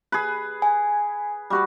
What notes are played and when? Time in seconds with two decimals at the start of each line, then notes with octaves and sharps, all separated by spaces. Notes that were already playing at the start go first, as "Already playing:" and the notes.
0.12 G#4 B4
0.62 G#5
1.50 G3 F#4 B4